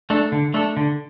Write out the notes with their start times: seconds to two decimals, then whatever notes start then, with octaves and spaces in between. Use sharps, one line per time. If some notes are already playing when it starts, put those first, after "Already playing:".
0.10 A3 D4 A4
0.32 D3
0.54 A3 D4 A4
0.77 D3